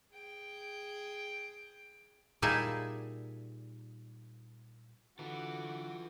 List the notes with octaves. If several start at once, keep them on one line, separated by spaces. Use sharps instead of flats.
G#4 G5
A#2 G3 D#4 E4 G#4 A5
D3 E3 F4 F#4 A4 D6